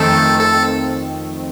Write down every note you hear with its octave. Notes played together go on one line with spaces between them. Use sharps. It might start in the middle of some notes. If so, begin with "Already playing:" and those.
Already playing: F2 D#3 A3 C4 A4
A4